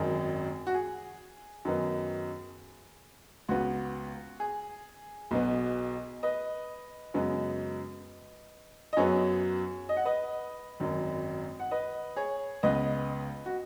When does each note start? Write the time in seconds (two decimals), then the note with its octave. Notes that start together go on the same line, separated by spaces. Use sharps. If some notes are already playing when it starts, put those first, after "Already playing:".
Already playing: G#1 F#2 D#3 G#4
0.67 F#4
0.74 G#4
1.65 F#2 D#3 B3
3.49 C#2 C#3 B3 F#4
4.40 G#4
5.31 B1 B2 B3
6.23 B4 D#5
7.14 F#2 C#3 G#3 B3
8.93 D#5
8.97 F#2 F#3 B3 G#4 C#5
9.89 D#5
9.97 F#5
10.05 B4 D#5
10.80 G#1 F#2 D#3
11.60 F#5
11.71 B4 D#5
12.16 G#4 C#5
12.63 C#2 C#3 B3 B4 D#5
13.46 F#4